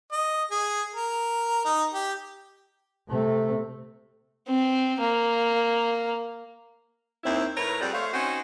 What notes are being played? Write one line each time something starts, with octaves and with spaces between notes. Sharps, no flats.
D#5
G#4
A#4
D#4
G4
C3 A3
C4
A#3
D#2 C4 E4
A2 A#4 B4 C#5
F2 G3 B3 G#4 C5 D5
A3 C5 C#5 F5
C4 C#4 D#4 F#4